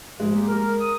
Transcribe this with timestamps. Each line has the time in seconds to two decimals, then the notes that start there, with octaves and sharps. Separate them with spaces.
0.20 G#2 F3 G#3
0.33 A#3 G4
0.48 A#4
0.81 D#6